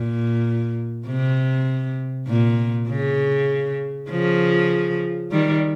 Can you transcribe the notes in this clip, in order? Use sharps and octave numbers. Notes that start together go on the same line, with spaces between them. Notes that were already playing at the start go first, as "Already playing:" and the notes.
Already playing: A#2
C3
A#2
C#3
C#3 F3
D#3 G3